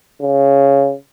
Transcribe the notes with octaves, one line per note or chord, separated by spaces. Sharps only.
C#3